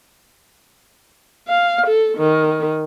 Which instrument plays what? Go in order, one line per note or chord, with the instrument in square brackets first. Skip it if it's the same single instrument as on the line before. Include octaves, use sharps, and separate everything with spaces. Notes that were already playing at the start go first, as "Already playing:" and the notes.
[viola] F5
A4
D#3